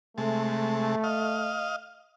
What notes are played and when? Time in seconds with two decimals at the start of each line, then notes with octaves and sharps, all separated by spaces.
0.18 C3 G#3 A3 A5
1.04 D#5 F5